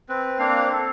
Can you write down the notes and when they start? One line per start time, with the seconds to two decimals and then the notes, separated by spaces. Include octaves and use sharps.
0.09 C4 B4
0.39 A#3 C4 D4 F5
0.73 A4